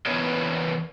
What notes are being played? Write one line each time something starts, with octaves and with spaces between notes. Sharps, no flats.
E2 E3 B3 A#4 C#5 D#5